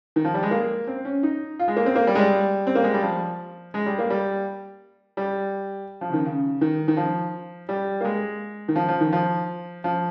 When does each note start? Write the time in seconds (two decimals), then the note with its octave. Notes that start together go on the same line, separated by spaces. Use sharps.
0.16 D#3
0.25 F3
0.34 G3
0.43 G#3
0.51 A#3
0.87 C4
1.05 C#4
1.23 D#4
1.59 F4
1.68 G#3
1.77 A#3
1.86 C4
1.95 A#3
2.07 G3
2.15 G#3
2.19 G3
2.67 C4
2.75 A#3
2.84 G#3
2.94 G3
3.03 F3
3.74 G#3
3.86 G3
3.99 A#3
4.10 G3
5.17 G3
6.01 F3
6.10 C#3
6.13 D#3
6.25 C#3
6.61 D#3
6.88 D#3
6.97 F3
7.69 G3
8.01 A#3
8.05 G#3
8.68 D#3
8.76 F3
8.88 F3
9.01 D#3
9.13 F3
9.84 F3